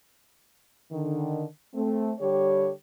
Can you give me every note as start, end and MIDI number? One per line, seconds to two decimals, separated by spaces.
0.91 1.44 50
0.91 1.44 51
1.74 2.11 57
1.74 2.11 60
2.20 2.70 50
2.20 2.70 55
2.20 2.70 67
2.20 2.70 73